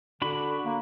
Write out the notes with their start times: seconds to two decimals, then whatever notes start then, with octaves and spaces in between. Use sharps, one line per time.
0.22 D3 D4 F#4 B5
0.65 A#3